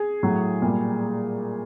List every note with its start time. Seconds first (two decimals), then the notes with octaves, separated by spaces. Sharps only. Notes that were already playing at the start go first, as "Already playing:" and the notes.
Already playing: G#4
0.23 A2 F#3
0.62 A#2 G3